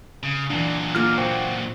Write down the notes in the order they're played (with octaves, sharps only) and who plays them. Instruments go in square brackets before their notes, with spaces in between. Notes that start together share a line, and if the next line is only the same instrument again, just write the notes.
[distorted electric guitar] C#3
[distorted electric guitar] A#2 F#3 [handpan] E3 D4
[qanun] A#3 F4 [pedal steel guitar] F6
[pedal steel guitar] F#4 G5 [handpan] C5